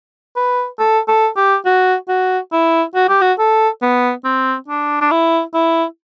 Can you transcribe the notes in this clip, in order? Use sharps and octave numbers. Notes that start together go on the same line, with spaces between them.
B4
A4
A4
G4
F#4
F#4
E4
F#4
G4
F#4
A4
B3
C4
D4
D4
E4
E4